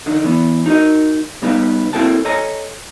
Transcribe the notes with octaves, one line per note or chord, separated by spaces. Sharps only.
D3 D#3 D4 D#4
E3 B3
D#4 F#4 A#4 D#5
C#3 G3 B3 D#4 G4 B4
A#3 C4 E4 A4 G5 A5
A4 C#5 D#5 G#5 A#5